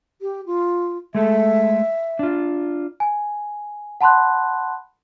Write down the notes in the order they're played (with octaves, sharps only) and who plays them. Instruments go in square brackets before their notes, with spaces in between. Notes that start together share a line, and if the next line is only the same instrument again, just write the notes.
[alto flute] G4
F4
[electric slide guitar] G#3 A3 A4 [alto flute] E5
[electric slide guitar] D4 F4
[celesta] G#5
F#5 A5 B5 C6 F#6